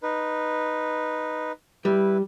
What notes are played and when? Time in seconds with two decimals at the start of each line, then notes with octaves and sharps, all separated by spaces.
0.03 D#4 B4
1.85 G3 E4 B4